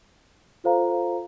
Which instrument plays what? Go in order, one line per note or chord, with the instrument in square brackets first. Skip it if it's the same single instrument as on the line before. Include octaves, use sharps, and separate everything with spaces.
[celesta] F4 A4 C5 F5 A#5